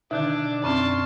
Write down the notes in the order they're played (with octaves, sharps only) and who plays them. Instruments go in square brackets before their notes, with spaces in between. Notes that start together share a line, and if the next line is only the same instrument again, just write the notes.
[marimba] B2 D3 D#3 [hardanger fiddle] D4 [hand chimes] D#4 E5
[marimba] F#2 C4 C#4 [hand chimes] D5 C#6 F6 [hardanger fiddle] A5 C6